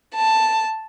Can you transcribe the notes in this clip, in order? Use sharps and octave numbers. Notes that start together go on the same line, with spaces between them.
A5